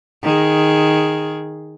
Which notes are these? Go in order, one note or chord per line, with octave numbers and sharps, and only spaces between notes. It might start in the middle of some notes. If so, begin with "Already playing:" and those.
D#3 G#4